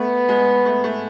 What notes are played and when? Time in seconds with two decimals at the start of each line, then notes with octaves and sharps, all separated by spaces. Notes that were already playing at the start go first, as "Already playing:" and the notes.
Already playing: A3 B3
0.29 G#3
0.65 A3
0.84 A3